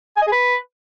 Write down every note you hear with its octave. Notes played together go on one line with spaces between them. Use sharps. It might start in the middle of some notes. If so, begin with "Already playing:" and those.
G#5
D#5
G#4
B4